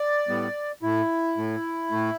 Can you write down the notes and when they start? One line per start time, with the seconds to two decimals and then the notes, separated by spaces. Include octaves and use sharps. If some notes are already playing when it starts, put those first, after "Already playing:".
Already playing: D5
0.28 A2 G3 B3
0.82 A2 A3 E4
1.37 A2 A3
1.91 A2 A3